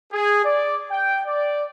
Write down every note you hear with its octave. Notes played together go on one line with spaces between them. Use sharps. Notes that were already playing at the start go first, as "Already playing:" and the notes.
G#4
D5
G5
D5